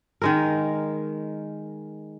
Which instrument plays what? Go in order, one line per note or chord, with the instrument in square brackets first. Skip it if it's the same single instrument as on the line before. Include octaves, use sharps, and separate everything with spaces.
[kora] D#3 G#3 A#4